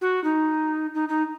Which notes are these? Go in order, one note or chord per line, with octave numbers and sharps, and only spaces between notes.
F#4
D#4
D#4
D#4